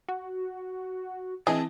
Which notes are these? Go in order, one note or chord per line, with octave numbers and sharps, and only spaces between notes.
F#4
E3 C4 G#4 D#5 A5